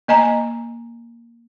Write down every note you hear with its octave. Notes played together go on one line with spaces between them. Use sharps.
A#3 D#5 G#5 A#5